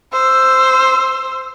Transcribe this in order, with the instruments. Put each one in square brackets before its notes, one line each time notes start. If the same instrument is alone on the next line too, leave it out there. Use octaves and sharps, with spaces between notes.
[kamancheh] C5 E6